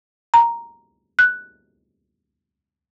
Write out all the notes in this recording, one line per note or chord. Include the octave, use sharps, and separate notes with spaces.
A#5
F#6